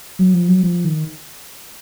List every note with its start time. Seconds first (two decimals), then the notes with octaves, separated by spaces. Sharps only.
0.19 F#3
0.34 F3
0.48 F#3
0.63 F3
0.85 D#3